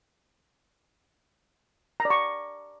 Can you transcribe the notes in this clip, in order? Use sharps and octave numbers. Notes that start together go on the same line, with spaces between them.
A#5
D5
C#6